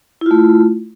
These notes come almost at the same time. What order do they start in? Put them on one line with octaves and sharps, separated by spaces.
E4 F4 A3